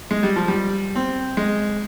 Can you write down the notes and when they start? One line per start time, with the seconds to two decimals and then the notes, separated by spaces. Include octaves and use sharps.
0.11 G#3
0.23 G3
0.36 F3
0.48 G3
0.95 C4
1.37 G#3